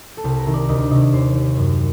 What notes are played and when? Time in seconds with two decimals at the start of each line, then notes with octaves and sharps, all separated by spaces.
0.17 A4
0.24 C2 G4
0.39 A#4
0.46 C3 D#3
0.54 D5
0.69 D2 D#5
0.80 D5
0.91 C3 D#3 D#5
1.01 D5
1.13 D#2 C5
1.35 D#3
1.57 F#2